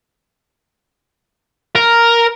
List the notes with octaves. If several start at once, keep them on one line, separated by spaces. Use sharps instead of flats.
A#4